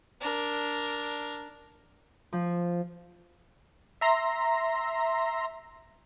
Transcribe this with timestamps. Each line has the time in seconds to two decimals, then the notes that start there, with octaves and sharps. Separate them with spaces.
0.21 D4 A#4
2.33 F3
4.01 E5 A#5 C6 A#6